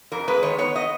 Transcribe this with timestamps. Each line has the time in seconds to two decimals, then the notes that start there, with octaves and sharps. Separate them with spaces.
0.12 F2 A#4
0.28 G#3 B4
0.43 D#3 C#5
0.58 B3 C#5
0.76 D#5